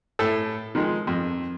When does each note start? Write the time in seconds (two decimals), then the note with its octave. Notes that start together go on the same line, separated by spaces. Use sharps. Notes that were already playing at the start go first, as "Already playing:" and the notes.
0.19 A2 A4
0.75 D#3 F3 G#3
1.07 F2